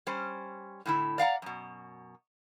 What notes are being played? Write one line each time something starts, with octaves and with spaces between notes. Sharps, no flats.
G3 C#4 C5
A2 D3 E4
D5 F5 F#5 A#5
F#2 B2